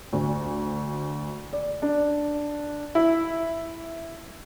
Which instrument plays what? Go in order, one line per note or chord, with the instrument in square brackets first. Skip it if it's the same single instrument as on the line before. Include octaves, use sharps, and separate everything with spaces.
[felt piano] D2
D5
D4
[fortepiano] E4